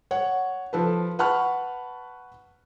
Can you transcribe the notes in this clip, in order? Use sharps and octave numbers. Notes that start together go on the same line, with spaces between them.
C#5 F#5
F3 A4 B4
B4 F#5 A5 B5 C#6 F6